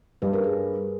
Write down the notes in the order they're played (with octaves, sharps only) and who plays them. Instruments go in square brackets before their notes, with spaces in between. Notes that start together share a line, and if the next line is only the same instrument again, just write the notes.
[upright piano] G2 [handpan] B4
[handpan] A#4
G#4